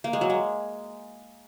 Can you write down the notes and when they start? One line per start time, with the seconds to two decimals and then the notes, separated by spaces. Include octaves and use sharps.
0.04 A#3
0.13 G#3
0.21 F#3
0.30 G#3